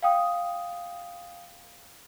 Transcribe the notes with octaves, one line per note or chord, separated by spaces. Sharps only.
F5 G5 D#6